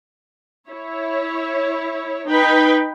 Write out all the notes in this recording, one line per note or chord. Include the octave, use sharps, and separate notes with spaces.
E4 C#5
D#4 B4 G5 B5